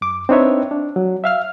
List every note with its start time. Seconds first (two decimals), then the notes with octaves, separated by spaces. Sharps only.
0.01 F#2 D6
0.29 C4 D4 D#4 B4 C#5 E5
0.71 D4
0.96 F#3
1.24 E5 F5 F6